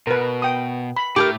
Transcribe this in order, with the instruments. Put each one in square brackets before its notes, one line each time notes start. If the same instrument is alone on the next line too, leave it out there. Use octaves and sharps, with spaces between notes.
[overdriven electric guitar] B2 [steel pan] A#4 B4
[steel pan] G5 D#6
B5
[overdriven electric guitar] A2 A3 [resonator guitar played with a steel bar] G4 G#4 A#4 [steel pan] D6